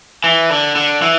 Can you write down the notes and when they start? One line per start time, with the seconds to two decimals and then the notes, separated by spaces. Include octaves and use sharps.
0.24 E3
0.50 D3
0.76 D3
1.02 E3